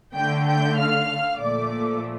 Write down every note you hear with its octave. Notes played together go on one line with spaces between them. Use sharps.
D3 A3 G5 G6
G5 G6
F5 F6
A#2 F3 A3 D5 D6